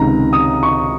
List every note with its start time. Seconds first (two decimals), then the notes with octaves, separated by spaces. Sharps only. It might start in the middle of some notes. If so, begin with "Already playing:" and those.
Already playing: C#2 C3 D#3 A#5
0.33 D#6
0.63 C#6